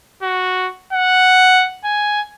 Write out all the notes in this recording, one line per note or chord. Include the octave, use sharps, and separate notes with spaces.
F#4
F#5
G#5